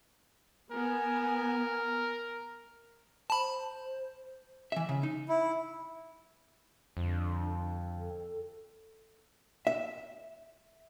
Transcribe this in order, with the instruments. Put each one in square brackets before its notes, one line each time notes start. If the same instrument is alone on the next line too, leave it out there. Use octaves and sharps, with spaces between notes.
[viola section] B3 G#5 [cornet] A#4
[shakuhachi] C5 [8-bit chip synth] A5 B5
[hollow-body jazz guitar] E3 E5
C#3
D#4
[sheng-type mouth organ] E4
[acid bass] F2 [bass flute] D3
[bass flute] A4
[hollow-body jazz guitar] E5